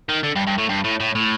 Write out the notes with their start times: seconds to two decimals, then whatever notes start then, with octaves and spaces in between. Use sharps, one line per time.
0.09 D#3
0.24 D3
0.36 G2
0.47 G2
0.58 A2
0.69 G2
0.84 A2
1.00 A2
1.15 A2